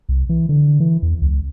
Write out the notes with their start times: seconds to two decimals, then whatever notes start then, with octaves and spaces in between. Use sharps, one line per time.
0.09 C2
0.29 E3
0.49 D3
0.80 E3
1.02 E2
1.22 C#2